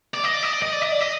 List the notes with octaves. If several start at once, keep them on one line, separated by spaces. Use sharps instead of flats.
D5
D#5
D5
D#5
D5
D#5
D5
D#5
D5
D#5